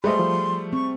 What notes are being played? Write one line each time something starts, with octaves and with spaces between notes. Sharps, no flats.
G3 A3 G#4 B4 C5 D#5 C6
F3
C4 C#6